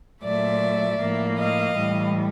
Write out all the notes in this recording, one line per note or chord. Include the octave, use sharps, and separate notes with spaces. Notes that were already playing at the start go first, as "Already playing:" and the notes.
A#2 F#3 A3 D5 E5
A2 F3 A#3
D#5 F5
A2 E3 G3